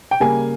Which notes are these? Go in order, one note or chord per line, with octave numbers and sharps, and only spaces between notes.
G5
C#3 G3 A#3 G#5